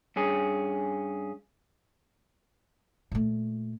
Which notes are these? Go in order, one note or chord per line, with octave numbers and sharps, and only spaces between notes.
G2 C#4 G#4
A#2 A3